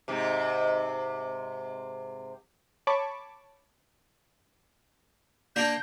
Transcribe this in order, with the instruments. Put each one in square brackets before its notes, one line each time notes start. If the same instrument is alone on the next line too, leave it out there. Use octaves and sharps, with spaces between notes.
[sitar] G#2 C3
[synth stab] C#5 A5 B5 C#6 D6
[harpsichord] A#3 D4 A#4 [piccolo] G6